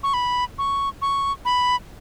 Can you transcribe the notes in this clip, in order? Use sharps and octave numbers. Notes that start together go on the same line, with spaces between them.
C#6
B5
C#6
C#6
B5